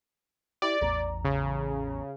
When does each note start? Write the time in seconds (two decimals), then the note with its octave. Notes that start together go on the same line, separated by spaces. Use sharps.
0.62 E4 G4 D5
0.81 A1 E2 A#5
1.25 C#3